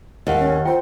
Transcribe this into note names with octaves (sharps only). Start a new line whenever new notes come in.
D#2 D#5 F5 F#5
C#4
F4 C5 G5